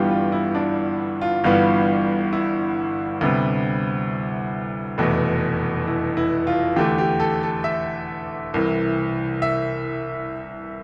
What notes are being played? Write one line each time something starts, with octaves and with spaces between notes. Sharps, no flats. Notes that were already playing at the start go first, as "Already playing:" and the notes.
Already playing: G1 G2 E3 G3 B3 F4 G4
F4
E4
D4
F4
G1 G2 E3 G3 B3 F4
E4
D2 C3 G3 B3
F1 E2 B2 A3
E4
E4
F4
E2 D3 A3 G4
G4
A4
A4
E5
C2 C3 E3
E5